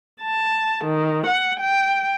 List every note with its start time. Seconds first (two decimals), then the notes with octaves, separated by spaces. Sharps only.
0.22 A5
0.84 D#3
1.26 F#5
1.59 G5